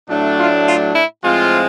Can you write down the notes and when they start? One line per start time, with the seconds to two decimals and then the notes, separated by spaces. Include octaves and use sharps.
0.09 A2 F#3 A3 D4
0.38 F4
0.67 F4
0.95 E4
1.24 A2 F3 G#3 C4 F4